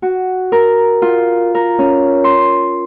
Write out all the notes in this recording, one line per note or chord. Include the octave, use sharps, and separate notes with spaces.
F#4
A#4
F4
A#4
C#4
C6